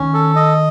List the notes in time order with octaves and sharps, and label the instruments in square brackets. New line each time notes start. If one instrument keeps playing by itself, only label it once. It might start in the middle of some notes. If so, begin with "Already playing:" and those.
Already playing: [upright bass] D#3 [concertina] C#4
[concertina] A4
D#5